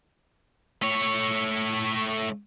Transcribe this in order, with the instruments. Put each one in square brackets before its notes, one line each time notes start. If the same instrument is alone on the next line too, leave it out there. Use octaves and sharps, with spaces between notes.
[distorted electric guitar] A3 C#5